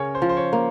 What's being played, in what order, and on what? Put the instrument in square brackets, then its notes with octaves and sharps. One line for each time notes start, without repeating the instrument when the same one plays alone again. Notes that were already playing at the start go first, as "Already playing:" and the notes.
Already playing: [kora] C#3 C#4 [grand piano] A#4 C#5
[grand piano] C5
[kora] F3
[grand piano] C5
C#5
[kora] A#3